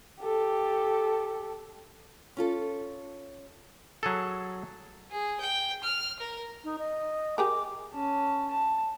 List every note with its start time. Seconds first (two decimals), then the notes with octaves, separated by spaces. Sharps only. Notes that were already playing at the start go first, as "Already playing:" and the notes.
0.21 G4 A4
2.37 C#4 F4 A4
4.03 F#3 G#4 A4
5.11 G#4
5.40 G5
5.83 F6
6.19 A#4
6.64 D#4
6.79 D#5
7.38 G4 G#4 A#4 D6
7.93 C#4 A5
8.51 A5